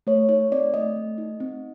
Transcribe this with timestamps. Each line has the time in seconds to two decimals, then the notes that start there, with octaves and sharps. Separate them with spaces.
0.07 A3 C#5
0.29 D#4 C#5
0.52 C4 D5
0.74 A3 D#5
0.96 A3
1.18 D#4
1.40 C4